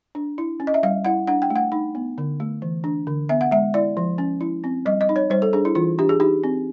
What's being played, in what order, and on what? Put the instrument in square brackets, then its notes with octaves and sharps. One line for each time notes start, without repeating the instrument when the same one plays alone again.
[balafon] D4
E4
C#4
D#5
E5
G3 F5
E4 F#5
D4 F#5
G5
A3
F#5
D#4
B3
D3
A3
E3
D4
D3
B3 E5
F#5
G#3 E5
E4 D5
F3
C#4
E4
C4
G3 D#5
D#5
D#4
C#5
G3 C5
A4
D4 G#4
E4
E3 F4
D4 G4
G#4
D#4 G4
C4